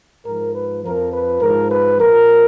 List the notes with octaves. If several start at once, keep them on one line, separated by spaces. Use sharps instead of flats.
G#2 F3 A#4
B4
F2 F3 A#4
B4
G#2 F3 A#4
B4
A#2 F3 A#4